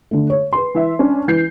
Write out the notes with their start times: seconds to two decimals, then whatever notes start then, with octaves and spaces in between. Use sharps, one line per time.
0.11 D3 A3
0.30 C#5
0.53 B4 C6
0.75 E3 E5
0.99 C#4 D4
1.28 E3 G6 C7